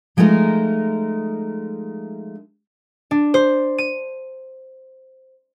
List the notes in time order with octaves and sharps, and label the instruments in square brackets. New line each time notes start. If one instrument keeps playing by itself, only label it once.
[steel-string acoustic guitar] F3 G#3 A3 D#4 A#4
[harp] D4
C5
D#7